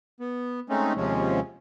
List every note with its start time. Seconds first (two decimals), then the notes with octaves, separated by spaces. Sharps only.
0.21 B3
0.70 G#3 A3 C4 C#4 D#4
0.96 D#2 C3 F3 G#3 C#4